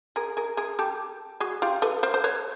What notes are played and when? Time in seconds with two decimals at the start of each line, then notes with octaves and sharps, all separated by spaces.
0.16 G#4 A#4
0.37 G#4 A#4
0.57 G#4 A#4
0.79 G4 A4
1.40 F#4 G#4
1.62 F4 G4
1.82 A4 B4
2.03 A#4 C5
2.14 C5
2.24 B4 C#5